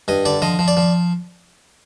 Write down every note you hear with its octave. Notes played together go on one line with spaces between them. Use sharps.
G2 D#5
D3 D5
F3 D#5
F3
D5
F3